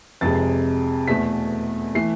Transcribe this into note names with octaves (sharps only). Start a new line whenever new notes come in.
F1 F2 C3 G#3 A6
E2 B2 A3 B6
E3 A3 C7